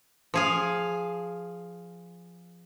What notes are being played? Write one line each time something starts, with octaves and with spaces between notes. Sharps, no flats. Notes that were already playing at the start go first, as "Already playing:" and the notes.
F3 G#4 F5